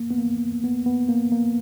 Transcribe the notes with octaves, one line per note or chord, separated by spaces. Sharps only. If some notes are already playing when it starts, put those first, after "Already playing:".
Already playing: A#3
B3
A#3
B3
B3
A#3
A#3